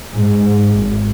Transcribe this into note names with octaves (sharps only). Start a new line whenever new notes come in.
G#2
G#1